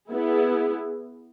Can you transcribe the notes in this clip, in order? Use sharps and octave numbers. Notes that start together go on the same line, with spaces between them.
B3 E4 G#4